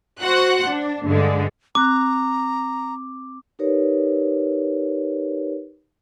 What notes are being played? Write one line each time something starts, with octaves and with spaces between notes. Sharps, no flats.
F#4 C5 F#5 F#6
D4
G2 D3 G#3
C4 A#5 D6 F#6
D#4 G4 A#4 B4 C#5 D5